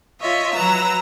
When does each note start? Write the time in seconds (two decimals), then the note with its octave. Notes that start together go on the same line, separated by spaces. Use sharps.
0.20 F4 C#5 D#5 E5
0.54 F#3 B4 A#5 E6